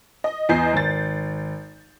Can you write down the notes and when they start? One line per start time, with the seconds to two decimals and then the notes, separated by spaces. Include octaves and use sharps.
0.24 D#5
0.49 E2 D#5 G6 C7
0.73 G#1 A6